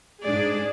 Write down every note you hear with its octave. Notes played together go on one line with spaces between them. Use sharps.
G#2 G#3 D4 G#4 D5